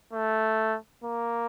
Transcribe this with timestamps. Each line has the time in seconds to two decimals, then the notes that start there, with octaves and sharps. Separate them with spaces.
0.13 A3
1.04 A#3